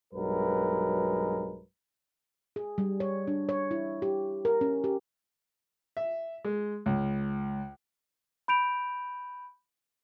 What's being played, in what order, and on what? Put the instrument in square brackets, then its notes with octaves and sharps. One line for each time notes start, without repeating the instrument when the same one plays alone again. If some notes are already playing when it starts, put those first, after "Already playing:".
[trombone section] B1 G2 F#3 G#3 A#4 B4
[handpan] G#4
G3
C#5
D4
C#5
E4
G4
A#4
C#4
G4
[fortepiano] E5
G#3
C#2
[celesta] B5 G6 D7 F7